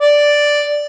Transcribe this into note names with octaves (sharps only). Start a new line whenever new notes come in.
D5